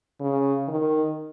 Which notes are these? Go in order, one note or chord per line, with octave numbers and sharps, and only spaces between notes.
C#3
D#3